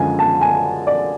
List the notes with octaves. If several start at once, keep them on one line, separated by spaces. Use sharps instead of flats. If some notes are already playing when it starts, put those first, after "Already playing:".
Already playing: F#2 D3 F3 G#3 G#5
A5
G#5
D5